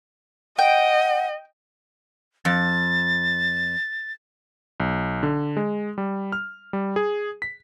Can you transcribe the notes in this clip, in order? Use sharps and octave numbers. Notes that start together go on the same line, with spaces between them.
D#5 F#5 G5
F2 A6
B1
D3
G#3
G3
F6
G3
G#4
B6